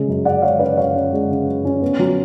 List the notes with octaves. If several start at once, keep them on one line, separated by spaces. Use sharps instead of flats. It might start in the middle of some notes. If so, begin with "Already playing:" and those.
Already playing: C#3 G#3
F#2
C#4 D5 F#5
G#3 C#5 F5
C#3 B4 D5
F#2 C#5 F5
C#4
G#3
C#3
F#2
C#4
B3
F#3